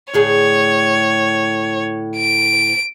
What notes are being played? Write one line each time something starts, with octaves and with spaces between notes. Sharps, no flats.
D2 A2 G#4 C#5
D7